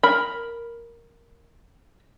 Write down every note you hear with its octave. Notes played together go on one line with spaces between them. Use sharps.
A#4 B5